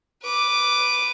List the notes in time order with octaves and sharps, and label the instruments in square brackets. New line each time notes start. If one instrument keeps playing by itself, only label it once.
[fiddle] B4 D6